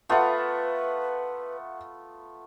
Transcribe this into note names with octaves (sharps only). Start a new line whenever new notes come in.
A3 B3 F4 B4 E5 F#5